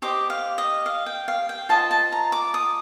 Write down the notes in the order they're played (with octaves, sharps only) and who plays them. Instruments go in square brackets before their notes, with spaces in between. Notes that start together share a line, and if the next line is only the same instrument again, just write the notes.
[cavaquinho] G4 C5 D#5 D6
F5
D#5
F5
G5
F5
G5
F4 C5 D#5 A5
A5
A#5
D6
D#6